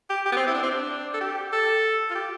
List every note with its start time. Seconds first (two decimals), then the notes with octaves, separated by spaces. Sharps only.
0.09 G4
0.25 G4
0.32 B3
0.36 C4
0.47 E4
0.54 D4
0.63 C4
0.71 D4
1.13 A4
1.21 G4
1.52 A4
2.10 F4
2.15 G4